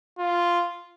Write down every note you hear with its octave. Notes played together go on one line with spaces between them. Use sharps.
F4